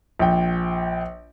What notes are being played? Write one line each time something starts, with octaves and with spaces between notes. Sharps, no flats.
A#1 G5